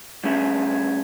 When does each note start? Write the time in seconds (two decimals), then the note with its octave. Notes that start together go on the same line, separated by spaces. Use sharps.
0.24 G2 A3 C#4 G#4 E5